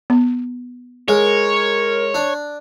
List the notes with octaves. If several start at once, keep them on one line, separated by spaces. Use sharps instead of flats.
B3
G#3 A#4 C#5
D4